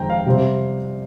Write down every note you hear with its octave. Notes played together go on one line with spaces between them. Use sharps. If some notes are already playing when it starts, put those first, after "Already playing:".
Already playing: F2 D#3 G#3 C4 G5 A#5
F5
C3 G3 C4